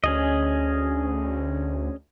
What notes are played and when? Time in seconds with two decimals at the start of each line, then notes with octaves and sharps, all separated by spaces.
0.04 D2 C#4 G#4 D#5